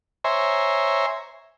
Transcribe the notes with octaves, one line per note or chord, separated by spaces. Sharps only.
C5 C#5 E5 G#5 A#5 C6